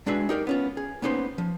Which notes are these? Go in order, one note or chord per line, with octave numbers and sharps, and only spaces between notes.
G#3 D4 F#4 G#4 B4 E5
D#4 G4 A#4 D5
B3 C#4 F4
G#4
A#3 B3 C#4 D#4 G4 C5
F3